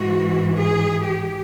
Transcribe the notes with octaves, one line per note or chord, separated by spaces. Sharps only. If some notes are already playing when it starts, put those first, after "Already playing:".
Already playing: G#2 E3 F#4
G#4
G4